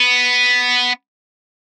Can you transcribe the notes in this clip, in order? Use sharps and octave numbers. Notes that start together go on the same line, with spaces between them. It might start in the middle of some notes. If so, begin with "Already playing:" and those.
Already playing: B3